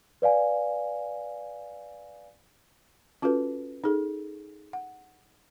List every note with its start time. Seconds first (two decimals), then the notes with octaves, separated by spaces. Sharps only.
0.22 B4 D5 F5 G#5
3.22 C#4 F4 F#4 A4 B4
3.84 D#4 G#4 A4
4.73 F#5